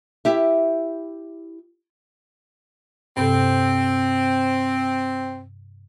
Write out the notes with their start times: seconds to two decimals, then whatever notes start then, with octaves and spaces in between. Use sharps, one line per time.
0.25 E4 G4 E5
3.17 G2 C3 C4 A4